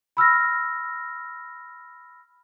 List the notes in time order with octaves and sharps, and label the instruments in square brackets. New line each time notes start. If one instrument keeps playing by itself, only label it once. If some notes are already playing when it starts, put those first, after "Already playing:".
[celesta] B5 E6 F6 A#6